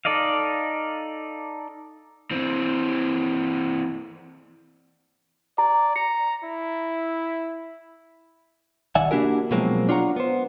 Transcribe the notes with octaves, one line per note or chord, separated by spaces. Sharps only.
D#4 A4 D5 D#5 F5
E3 C4
D5 A#5
A#5 C#7
E4
C2 D#3 D5 E5 F#5 G#5
A#3 D4 E4 F#4 G4 A#4
B2 F3 F#3 G#3 A#3 C4
D4 F4 C#5 F#5 A#5
B3 C5